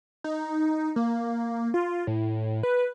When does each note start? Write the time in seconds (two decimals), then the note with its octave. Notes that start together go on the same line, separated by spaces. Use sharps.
0.24 D#4
0.96 A#3
1.74 F4
2.07 A2
2.63 B4